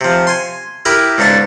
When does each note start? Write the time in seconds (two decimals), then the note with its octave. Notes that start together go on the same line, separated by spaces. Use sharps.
0.01 C3 F3
0.27 G#5 C6
0.85 E4 G4 A#4 B4 B5 D6
1.18 C#2 G#2 B3 D4 A5